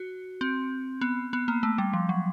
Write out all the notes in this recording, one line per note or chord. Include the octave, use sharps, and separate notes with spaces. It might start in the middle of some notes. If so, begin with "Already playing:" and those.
Already playing: F#4
C4
B3
B3
A#3
A3
G3
F3
F#3